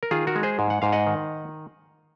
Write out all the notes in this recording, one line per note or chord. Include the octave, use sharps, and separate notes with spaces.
A#4
D#3 F4 G#4
F#4 A#4
G#3
G#4 C5
G#2
F#5
G#2 F5
D#5 F#5
D#3